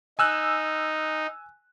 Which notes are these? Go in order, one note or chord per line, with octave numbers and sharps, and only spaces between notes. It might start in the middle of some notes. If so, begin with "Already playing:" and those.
D#4 G#5 E6 F#6